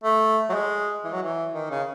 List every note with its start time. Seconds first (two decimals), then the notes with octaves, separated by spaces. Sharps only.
0.04 A3
0.50 F#3
0.54 G#3
1.05 E3
1.13 F#3
1.23 E3
1.55 D#3
1.71 C#3